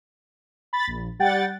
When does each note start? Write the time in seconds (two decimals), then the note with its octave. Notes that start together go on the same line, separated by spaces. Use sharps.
0.73 B5 A6
0.87 A#1
1.19 G3 F#5 G5 A6